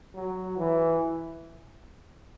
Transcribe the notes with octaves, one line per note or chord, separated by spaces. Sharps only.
F#3
E3